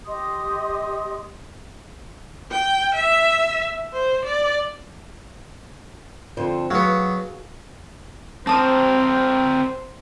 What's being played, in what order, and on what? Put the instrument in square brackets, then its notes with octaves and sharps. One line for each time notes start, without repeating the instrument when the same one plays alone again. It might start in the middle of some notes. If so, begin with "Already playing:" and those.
[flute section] G4 D#5 C6 D#6
[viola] G5
E5
C5
D5
[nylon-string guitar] F2 D3 C5
[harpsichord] F#3 B3 [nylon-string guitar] F#4 G#4 F5
[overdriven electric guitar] C4 A#4 [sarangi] C5 [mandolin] A5 D#6